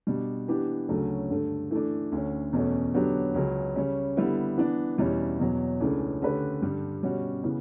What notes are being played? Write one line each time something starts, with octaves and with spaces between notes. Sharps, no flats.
B2 G3 D4
E3 B3 D4 G4
D2 C#3 F#3 A3 C#4
G2 D3 A3
E3 A3 D4
D2 D3 A3 C#4
E2 B2 A3 C#4
D3 F#3 B3 D4 G4
C#2 C#3 F#3
C#3 G3 C#4
D3 G3 B3 E4
E3 B3 D4
E2 B2 G3 C#4 E4
E2 B2 F#3
C#2 C#3 E3 A3 D4
D3 A3 C#4 G4 B4
G2 D3 G3
B2 G3 C#4 F#4
C#3 E3 B3